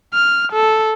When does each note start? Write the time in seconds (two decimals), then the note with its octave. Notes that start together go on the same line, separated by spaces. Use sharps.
0.14 F6
0.52 A4